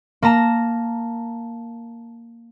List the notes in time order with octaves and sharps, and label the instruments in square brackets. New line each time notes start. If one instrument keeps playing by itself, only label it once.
[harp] A#3 A5 A#5 E7